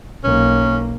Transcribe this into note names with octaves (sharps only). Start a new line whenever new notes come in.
B1 A#3 C#4